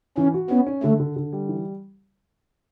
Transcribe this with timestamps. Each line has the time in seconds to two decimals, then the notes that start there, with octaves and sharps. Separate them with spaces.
0.17 E3 C#4
0.34 F#4
0.50 B3 C#4
0.67 C#4
0.83 D3 A3
1.00 D3
1.16 D3
1.33 G3
1.49 E3